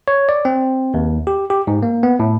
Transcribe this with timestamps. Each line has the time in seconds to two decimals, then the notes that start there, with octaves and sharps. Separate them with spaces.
0.08 C#5
0.29 D5
0.45 C4
0.94 D#2
1.27 G4
1.50 G4
1.67 G#2
1.83 A#3
2.03 B3
2.20 A2